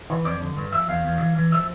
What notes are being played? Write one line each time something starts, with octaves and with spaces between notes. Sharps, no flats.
E3
F2 D5
D3
G2
F3 E5
E2 F5
E2
E3
E3
F3 E5